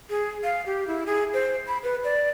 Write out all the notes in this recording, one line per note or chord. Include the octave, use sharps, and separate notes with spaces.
G#4
F5
G4
E4
G#4
C5
B5
B4
D5